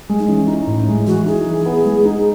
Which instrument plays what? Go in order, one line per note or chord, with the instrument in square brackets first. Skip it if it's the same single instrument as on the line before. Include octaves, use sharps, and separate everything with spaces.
[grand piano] G#3
[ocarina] D#4
[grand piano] E3 [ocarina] C#4
[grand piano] D#4
A2
G#3
[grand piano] E3 [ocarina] F#4
[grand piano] D#4 [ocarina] G#4
[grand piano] E3
B3
G#3
D#4